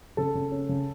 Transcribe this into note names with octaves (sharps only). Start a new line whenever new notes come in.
C#3 A4
C#3
C#4
C#3